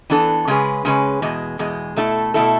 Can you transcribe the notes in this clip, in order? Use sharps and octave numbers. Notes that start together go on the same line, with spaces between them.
E3 B3 D4 A4
C#3 G#3 C#4 G#4 B4
C#3 G#3 C#4 G#4 B4
E2 B2 G#3
E2 B2 G#3
B2 A3 E4 A4
B2 A3 E4 A4